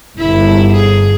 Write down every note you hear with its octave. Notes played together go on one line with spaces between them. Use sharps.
G1 E4
G#4